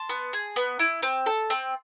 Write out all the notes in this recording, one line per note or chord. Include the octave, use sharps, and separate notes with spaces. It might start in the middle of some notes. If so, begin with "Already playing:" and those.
Already playing: A5 C6
B3
G#4
B3
E4
C4
A4
C4